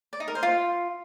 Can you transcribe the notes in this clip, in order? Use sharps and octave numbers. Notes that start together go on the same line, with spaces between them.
D5
D#4
A#4
C5
F4